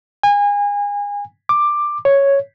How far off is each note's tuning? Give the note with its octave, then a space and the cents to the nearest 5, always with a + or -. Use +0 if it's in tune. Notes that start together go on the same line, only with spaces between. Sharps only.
G#5 -30
D6 +10
C#5 +0